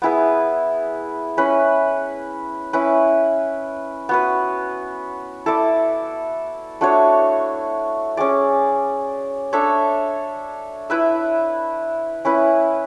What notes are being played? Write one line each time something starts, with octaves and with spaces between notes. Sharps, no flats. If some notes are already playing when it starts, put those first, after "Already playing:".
B3 E4 G#4 B4
C#4 E4 B4
C#4 E4 B4
B3 F#4 B4
E4 A4 D5
A3 D4 F#4 C#5
C#4 G#4 D5
D4 A4 C#5 E5
E4 B4 E5
C#4 E4 B4